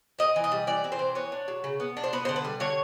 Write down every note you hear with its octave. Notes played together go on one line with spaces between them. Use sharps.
C4 D#5
E3
D#5
G3
E3 D5
C4
C5
E3
B3 C#5
D4
F#3
C#3
B3
D4
C5
B3 B4
D3 C5
B4
G3
D3 C#5